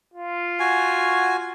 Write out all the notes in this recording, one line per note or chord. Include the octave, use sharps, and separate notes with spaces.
F4
F#4 G#5